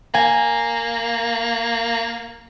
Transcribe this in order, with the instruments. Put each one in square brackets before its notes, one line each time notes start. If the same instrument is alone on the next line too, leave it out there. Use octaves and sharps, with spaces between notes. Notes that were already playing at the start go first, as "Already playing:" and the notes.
[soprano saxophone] A#3 [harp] G#5